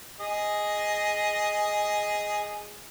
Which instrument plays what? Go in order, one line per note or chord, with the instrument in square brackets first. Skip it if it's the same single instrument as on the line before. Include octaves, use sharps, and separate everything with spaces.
[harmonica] G#4 D#5